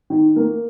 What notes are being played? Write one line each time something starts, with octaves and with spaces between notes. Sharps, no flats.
D#3
A#3